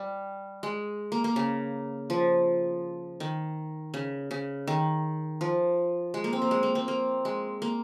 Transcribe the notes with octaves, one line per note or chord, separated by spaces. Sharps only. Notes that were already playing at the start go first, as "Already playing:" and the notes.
Already playing: G3
G#3
A#3
A#3
C#3
F3
D#3
C#3
C#3
D#3
F3
G#3
A#3
C4
A#3
G#3
A#3
C4
A#3
G#3
A#3